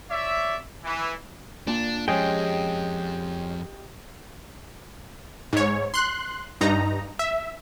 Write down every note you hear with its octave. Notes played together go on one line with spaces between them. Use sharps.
C#5 D5 E5
E3
A#2 D4
F2 F3 G#3 C#4 G4 G#4 D#5 G5
G#2 C#5
C6 F#6
G2 D#4 A#5
E5